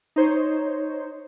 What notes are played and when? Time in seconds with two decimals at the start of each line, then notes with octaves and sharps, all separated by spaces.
0.16 D#4 C5 C#5